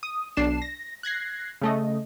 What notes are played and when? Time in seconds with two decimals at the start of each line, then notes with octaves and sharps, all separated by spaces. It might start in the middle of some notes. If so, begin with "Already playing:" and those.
0.03 D#6
0.37 B1 D4 C7 E7
0.62 A#6
1.03 F#6 G#6 A#6 C7
1.62 C#3 A3 D#5